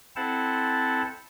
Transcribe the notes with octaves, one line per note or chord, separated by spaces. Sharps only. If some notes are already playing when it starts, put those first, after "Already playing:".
C4 E4 A4 C5 F#5 A5